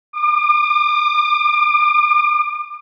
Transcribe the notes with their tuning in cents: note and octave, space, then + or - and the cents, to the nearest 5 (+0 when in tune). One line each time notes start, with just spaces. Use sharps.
D6 +40